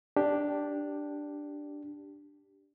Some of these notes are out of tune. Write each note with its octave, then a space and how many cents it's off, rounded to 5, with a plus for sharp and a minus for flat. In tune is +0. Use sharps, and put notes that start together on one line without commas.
D4 +0 G4 +0